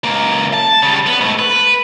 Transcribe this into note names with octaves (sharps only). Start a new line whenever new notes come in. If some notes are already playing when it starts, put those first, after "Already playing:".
C#2 A#3
A5
C#3 G3
B3
G#2 A3
B4